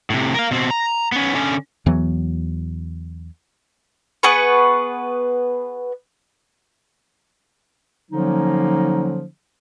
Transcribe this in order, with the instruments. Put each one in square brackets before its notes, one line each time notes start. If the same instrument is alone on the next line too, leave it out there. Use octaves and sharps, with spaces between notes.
[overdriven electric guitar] A2 C3
A#4 F5
B2 C4
A#5
B3 C#4
D3 C#4
[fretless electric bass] E2 E3 F#3 B3
[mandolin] B3 G#4 B4 C#6
[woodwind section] D3 F3 F#3 A#3 C#4 D#4